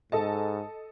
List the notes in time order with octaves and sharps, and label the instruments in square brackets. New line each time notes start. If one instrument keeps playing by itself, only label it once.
[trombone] G#2 [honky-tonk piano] A4 D#5 A5